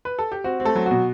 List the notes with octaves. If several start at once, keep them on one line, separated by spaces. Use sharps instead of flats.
B4
A4
G4
C4 F#4
C4
A3 A4
F#3
B2 F#4